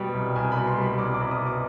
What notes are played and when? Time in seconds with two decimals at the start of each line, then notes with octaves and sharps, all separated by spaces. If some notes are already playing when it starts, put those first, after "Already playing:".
Already playing: B2 G3 G5
0.14 C2
0.36 C2 G#5
0.52 B2 B5
0.67 C6
0.78 G3
0.84 B5
0.98 C2 D6
1.14 D6
1.21 C2
1.31 D#6
1.42 B2 D6